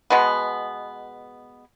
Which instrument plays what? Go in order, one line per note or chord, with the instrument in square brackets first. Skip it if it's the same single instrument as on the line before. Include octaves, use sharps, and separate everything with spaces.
[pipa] B2 G#3 B3